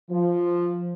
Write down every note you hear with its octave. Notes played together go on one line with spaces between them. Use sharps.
F3